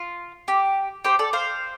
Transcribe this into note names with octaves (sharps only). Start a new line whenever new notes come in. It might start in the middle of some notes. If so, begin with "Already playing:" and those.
Already playing: F4
G4
G4 C5
A4 D5
C5 F5